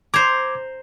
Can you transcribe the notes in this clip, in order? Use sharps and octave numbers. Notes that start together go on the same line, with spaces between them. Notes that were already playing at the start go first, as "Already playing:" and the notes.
C5 A#5 D6 G#6